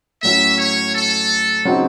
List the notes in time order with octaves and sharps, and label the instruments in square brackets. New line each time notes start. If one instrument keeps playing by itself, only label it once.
[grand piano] A2 F#3 C#4 [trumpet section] E5
[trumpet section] C#5
A4
[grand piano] C#3 F#3 C4 D#4 F#4